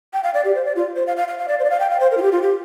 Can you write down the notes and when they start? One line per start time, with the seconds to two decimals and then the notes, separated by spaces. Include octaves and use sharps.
0.13 G5
0.23 F5
0.34 D5
0.45 G4
0.55 C5
0.65 D5
0.76 F4
0.96 C5
1.07 F5
1.17 F5
1.28 F5
1.39 F5
1.48 D5
1.59 C5
1.65 D5
1.70 F5
1.80 G5
1.90 F5
2.00 C5
2.11 A#4
2.17 F4
2.22 G4
2.32 F4
2.42 G4